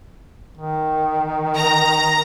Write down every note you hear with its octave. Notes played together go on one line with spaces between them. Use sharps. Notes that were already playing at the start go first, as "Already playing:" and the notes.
D#3
A#5